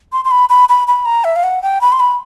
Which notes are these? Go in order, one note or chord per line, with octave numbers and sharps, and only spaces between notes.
C6
C6
B5
B5
B5
B5
A#5
E5
F5
F#5
G5
B5
C6
B5